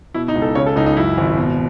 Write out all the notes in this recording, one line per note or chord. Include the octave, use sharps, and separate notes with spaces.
B2 E4
D#4
C#2
A4
C#3 C#5
A4
C#2 D#4
D#4
F#2 E4
G#1
B2